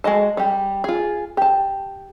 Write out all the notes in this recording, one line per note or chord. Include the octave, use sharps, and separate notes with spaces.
G#3 F#4 D#5 A5
G3 G4
F4 G#4
G4 A5